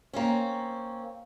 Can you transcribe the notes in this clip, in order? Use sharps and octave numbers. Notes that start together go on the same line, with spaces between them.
A#3 C4 C#4